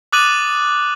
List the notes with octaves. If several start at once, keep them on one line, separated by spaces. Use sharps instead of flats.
D6 D#6 F#6 A6 D#7 F#7